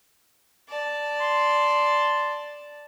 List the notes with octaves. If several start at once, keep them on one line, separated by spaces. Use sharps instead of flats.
D5 A5
C6